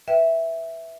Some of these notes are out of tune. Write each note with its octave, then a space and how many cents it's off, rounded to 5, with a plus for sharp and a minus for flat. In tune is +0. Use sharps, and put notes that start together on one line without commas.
B4 +0 E5 +0 G5 -10